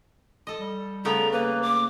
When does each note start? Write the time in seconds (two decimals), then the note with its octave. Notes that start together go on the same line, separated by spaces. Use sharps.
0.47 A4 D#5
0.58 G3
1.05 C#3 A3 B3 A#5
1.32 A#3 B4
1.62 D6